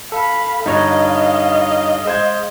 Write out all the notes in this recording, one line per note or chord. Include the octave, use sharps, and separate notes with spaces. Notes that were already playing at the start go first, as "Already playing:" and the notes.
A4 F5 B5
G2 D3 D#4 C#5 D#5 F5 A#5
G#3 C5 G#6